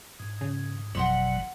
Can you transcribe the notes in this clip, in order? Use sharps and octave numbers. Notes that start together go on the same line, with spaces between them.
G#2
C#3
G1 F2 B2 F#3 F#5 C6 E6